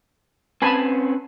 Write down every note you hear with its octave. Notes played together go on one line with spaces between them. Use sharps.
C4 C#4 B4 G#5 A5 B5